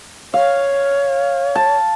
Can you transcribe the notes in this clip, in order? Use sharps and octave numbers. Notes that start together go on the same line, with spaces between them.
C#5 F5
A5